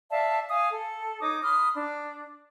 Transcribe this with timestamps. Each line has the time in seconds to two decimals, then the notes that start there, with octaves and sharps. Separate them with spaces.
0.11 D5 E5 F5 A5
0.49 F5 G#5 D#6
0.71 A4
1.21 D#4 C#5 D6 D#6
1.42 B5 C6 D#6 F6
1.75 D4